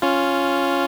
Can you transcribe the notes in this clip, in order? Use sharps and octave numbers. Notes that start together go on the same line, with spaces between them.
C#4 F4